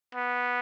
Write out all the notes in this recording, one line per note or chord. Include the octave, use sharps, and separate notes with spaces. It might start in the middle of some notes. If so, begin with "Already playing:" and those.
B3